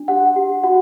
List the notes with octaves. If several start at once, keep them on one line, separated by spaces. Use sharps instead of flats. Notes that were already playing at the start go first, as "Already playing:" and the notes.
Already playing: D4
G4 F#5
G4
F#4 F#5